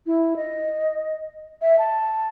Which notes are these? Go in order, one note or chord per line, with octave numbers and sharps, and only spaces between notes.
E4
D#5
E5
A5